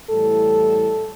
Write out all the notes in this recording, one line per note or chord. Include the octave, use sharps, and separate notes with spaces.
A2 E3 G3 A4